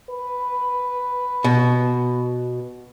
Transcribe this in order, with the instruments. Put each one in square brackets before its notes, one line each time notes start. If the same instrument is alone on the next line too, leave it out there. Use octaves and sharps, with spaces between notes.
[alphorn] B4
[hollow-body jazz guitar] B2